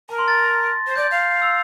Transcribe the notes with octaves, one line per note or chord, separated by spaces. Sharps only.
A#4 A5
C6
A6
A#6
C5
D5 G6
F5
E6